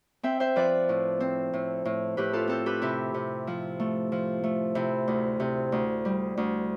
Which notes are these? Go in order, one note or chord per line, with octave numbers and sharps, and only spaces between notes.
C4 E5 G5
C5 E5
F3 B4 D5
A2
C4
A2
A2
A2 G4 B4
F4 A4
C4 A4 C5
G4 B4
C3 E4 G4
C3
F3
A3
F3
A3
C3 E4
D2
C3
D2
G3
D2